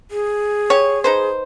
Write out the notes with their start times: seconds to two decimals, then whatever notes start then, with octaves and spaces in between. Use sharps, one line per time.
0.11 G#4
0.70 G4 C#5
1.04 D#4 B4 C5